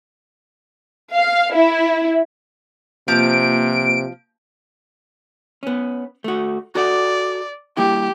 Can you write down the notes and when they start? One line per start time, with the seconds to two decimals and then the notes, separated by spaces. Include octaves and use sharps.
1.13 F5
1.53 E4
3.08 C3 F3 A#3 F4 B4 D7
5.63 B3 C#4
6.24 A3 F#4
6.75 F#4 A4 D5 F#5
7.77 G3 A#3 E4 G4